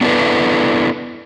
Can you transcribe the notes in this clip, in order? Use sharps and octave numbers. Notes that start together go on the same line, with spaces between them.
B3 D4 E4 G4 A4 B4